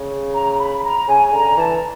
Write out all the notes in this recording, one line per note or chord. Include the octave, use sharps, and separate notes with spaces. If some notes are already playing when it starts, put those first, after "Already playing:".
Already playing: C#3
A#5
B5
A#5
C#3 G#5
D3 A#5
E3 A5